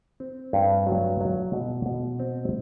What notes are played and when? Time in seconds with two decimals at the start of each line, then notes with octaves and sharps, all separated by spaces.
0.20 C4
0.53 G2
0.87 F#3
1.21 F#3
1.53 B2
1.86 B2
2.19 C4